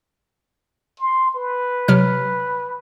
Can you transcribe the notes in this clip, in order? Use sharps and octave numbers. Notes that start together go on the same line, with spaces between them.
C6
B4
C3 F#3 F6